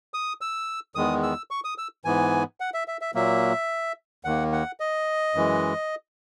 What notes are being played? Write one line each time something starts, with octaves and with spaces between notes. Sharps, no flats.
D#6
E6
E2 D#3 G#3 B3 D#6
E6
C#6
D#6
E6
G#2 E3 B3 G#5
F#5
E5
E5
E5
A#2 F#3 A#3 E5
D#2 D#3 A#3 F#5
F#5
D#5
F#2 E3 G#3